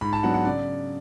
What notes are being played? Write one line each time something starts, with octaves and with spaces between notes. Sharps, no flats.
G#2 B5
A5
F#3 B3 D4 F#5
F#5
C#3 D5